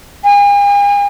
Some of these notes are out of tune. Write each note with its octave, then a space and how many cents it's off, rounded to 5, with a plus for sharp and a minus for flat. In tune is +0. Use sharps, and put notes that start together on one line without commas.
G#5 -40